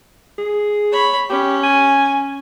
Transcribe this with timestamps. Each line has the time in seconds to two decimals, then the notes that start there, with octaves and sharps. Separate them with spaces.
0.38 G#4
0.92 C#5 B5
1.30 C#4 G4
1.63 G#5